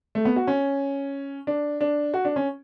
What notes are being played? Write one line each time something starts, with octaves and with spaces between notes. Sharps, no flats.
A3
B3
F#4
C#4
D4
D4
F#4
D4
C#4